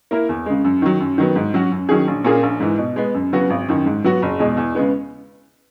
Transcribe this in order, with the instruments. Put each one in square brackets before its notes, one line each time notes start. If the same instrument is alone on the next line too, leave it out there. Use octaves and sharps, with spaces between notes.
[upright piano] A#3 E4 A#4
E2
C#3 G#3
F#2
D#3 F#3
F#2
D#3 F#3 B3
G#2
F#3 C#4 F#4
F#2
D#3 F#3 C#4 G#4
A#1
A#2 A#3 C#4 G#4
A#1
G#2 E3
B2
G#3 B3
F#2
C#3 F#3 B3 F#4
G#1
F#2 D#3
G#2
F#3 B3 F#4
F#1
E2 B2 G#3
E2
C#3 G#3 B3